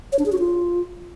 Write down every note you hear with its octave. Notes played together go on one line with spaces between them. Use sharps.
C#5
D4
G#4
F#4
F4